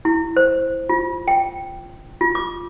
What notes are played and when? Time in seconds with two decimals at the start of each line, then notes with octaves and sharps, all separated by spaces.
0.05 E4
0.37 C5
0.89 F4
1.28 G5
2.21 F4
2.35 D6